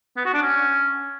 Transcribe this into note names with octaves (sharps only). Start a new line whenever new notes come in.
B3
F#4
D4
C#4